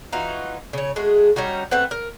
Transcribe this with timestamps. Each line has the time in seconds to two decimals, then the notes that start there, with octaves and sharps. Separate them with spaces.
0.13 E3 D#4 F4 F#4
0.73 C#3 C#5
0.96 G#3 A3 F#4 G#4
1.36 G3 C#4 D#4 F#4
1.71 A3 C4 B4 F#5
1.91 A#4